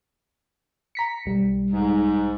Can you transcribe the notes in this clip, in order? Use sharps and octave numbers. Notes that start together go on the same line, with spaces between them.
A#5 B6 C#7
B1 G3
G#2